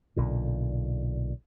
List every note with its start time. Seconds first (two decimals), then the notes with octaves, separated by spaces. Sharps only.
0.16 B1 A#2 D3